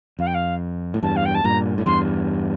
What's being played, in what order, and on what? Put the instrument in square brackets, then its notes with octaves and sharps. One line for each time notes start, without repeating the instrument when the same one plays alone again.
[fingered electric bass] F2 [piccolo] F5
[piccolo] G5
F5
[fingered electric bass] A2
[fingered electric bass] E2 G2 [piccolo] A5
[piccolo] F5
G5
A5
[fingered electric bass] G2 A#2 [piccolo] A#5
[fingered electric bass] A2
[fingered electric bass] E2 G2 [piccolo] C6